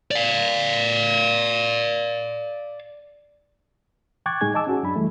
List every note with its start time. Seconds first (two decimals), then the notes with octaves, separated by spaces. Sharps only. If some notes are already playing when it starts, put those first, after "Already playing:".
0.11 D5 F5
4.26 G5 C#6 D6 F#6 G#6 A6
4.41 A2 G#3 D#4 G#4 G#5 G#6
4.54 D#5 G#5 A5 D6 E6
4.67 C#4 F#4 G#4
4.83 F#2 D4 B5
4.96 E3 G3 A3